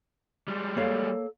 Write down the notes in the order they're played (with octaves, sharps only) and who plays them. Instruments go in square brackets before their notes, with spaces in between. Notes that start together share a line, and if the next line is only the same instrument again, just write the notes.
[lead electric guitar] G3 G#3
[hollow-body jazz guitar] A#3 C#5 F5 [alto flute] A4